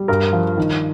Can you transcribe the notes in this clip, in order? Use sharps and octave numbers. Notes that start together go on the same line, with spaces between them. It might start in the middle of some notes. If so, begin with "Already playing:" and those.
Already playing: G3
G2 A#4
F3
D#3